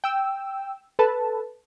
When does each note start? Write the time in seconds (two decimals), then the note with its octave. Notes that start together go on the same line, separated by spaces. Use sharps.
0.04 G5 E6
0.99 A4 B4 A5